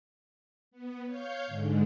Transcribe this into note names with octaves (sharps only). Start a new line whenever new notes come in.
B3
C#5 F5 G6
G#2 D3 G#3